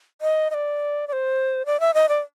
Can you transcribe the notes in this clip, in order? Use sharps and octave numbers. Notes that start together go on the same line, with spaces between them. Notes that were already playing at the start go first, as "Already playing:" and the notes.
D#5
D#5
D5
D5
C5
D5
E5
D#5
D5